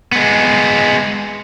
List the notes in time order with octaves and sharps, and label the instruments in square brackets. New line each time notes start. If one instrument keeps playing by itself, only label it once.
[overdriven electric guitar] G#3 B3